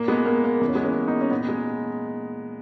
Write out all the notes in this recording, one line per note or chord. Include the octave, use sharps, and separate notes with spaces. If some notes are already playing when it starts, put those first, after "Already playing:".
Already playing: A#2 A#3
G#3 B3
A#3
A#3
E2 C#3 E3 B3
C#4
G#3 B3
A#3 C#4
B3 D#4
C#4
A#2 B3 D#4
G#3